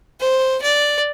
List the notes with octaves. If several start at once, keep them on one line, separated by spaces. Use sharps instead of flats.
C5
D5